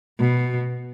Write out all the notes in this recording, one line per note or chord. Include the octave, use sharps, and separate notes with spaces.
B2